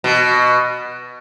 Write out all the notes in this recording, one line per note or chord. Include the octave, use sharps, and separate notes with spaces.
B2